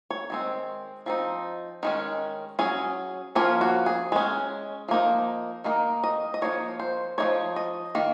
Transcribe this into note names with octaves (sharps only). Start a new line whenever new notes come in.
C#5
D#3 G#3 C4
F3 C4 D#4
D#3 G#3 C#4
F#3 C#4 G#4
F3 A#3 C#4 F4
F#4
G#4
G#3 C#4
F3 A#3 D#4
D#3 A#3 D#4 A#4
D#5
D#5
F3 A#3 D#4 C#5
C5
F3 A#3 D#4 C#5
D#5
D#3 A#3